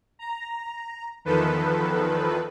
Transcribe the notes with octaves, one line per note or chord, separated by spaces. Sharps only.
A#5
E2 D#3 F3 A4 B4